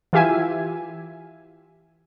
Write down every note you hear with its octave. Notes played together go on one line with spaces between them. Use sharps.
E3 F4 G4 E5 G#5